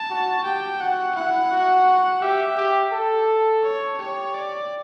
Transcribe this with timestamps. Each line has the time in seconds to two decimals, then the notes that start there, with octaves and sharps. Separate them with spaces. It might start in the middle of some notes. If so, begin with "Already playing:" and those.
Already playing: A5
0.10 F#4
0.45 G4 G5
0.80 F#4 F#5
1.15 E4 F#5
1.51 F#4
2.21 G4 E5
2.57 G4
2.92 A4
3.63 C#5
3.98 G4 C#5
4.35 D5